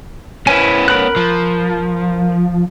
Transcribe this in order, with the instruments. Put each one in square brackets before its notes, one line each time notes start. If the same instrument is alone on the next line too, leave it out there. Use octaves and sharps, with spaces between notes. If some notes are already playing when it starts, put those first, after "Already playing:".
[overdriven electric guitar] B3 C#4 [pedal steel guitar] E4 G#5
[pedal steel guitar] A#4 B5 F#6
[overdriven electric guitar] F3